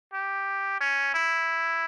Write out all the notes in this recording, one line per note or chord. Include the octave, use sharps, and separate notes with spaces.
G4
C#4
E4